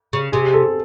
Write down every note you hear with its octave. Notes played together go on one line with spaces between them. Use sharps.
C#3
C3 G#4
A4